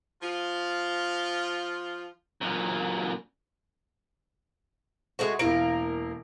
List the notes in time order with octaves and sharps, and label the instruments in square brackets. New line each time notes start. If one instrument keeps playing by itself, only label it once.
[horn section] F3 F4
[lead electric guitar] F#2 A#2
[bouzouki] G#3 A3 F#4
[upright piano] E1 E4 D7 [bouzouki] A#3